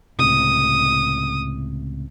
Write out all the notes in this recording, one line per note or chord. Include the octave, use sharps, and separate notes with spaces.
C#2 A2 C3 D#6